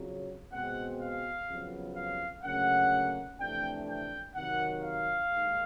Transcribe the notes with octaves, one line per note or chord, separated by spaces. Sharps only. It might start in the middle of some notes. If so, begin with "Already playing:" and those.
Already playing: F2 C#3 F#3
B2 G#3 C4 F#5
F5
F2 C#3 F#3 B3
F5
D2 C#3 F#3 A#3 C#4 F#5
F2 C3 E3 A3 D4 G5
G5
C3 D#3 F#3 F#5
F5
D#2 D#3 G#3